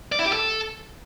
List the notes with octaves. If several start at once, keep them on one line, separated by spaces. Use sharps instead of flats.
D5
E4
G4
A4